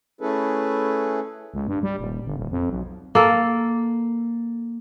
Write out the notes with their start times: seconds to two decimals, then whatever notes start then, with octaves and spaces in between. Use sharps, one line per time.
0.21 A3 C#4 E4 G#4 A4 B4
1.54 C#2
1.68 G2
1.83 G3
1.99 D#1
2.25 G1
2.37 D#1
2.51 F2
2.70 B1
3.15 A#3 A4